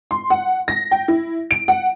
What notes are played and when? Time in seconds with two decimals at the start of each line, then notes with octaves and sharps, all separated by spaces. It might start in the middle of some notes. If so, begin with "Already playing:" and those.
0.11 C6
0.30 F#5
0.68 A#6
0.91 G5
1.08 E4
1.51 D7
1.68 F#5